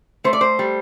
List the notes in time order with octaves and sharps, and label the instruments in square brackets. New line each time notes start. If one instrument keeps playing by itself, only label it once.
[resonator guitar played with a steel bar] A3 C5
D5
C5
G3